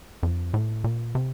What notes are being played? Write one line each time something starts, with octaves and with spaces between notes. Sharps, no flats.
F2
A2
A#2
C3